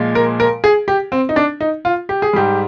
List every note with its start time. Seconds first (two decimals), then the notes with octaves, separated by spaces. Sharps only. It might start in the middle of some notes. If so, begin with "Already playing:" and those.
Already playing: A#2 F3 G#3
0.15 A#4
0.40 A#4
0.64 G#4
0.88 G4
1.12 C4
1.29 D#4
1.36 D4
1.60 D#4
1.85 F4
2.09 G4
2.22 G#4
2.33 G#2 G3 G4